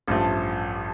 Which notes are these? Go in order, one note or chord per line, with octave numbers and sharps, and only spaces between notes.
A1 G2 F3 A3